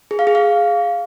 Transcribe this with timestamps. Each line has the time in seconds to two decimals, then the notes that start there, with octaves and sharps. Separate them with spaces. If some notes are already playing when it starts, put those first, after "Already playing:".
0.11 G#4
0.19 F5
0.27 G#4
0.35 F5